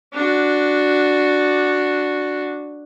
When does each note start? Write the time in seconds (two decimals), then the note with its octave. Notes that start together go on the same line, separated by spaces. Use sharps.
0.13 D4 F#4